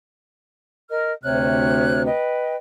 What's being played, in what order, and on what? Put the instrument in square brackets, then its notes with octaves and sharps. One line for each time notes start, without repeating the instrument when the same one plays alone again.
[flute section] A#4 D#5 F6
[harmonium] D2 C3 [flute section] C#5 F6 F#6
[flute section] B4 D#5 G5